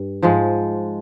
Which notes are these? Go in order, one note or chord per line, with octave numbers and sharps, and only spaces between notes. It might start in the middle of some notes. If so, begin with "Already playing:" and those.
Already playing: G2
G#2 F3 G#3